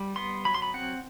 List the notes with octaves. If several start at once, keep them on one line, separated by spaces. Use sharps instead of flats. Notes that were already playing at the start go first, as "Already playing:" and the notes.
Already playing: G3
B3 C6
F#3 B5
C6
B5
C4 F#5